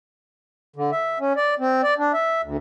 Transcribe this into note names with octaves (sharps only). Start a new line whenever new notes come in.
D3
E5
C#4
D5
C4
D5
D4
E5
D2